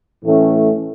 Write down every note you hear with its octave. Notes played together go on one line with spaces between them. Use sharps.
A2 E3 A3 C#4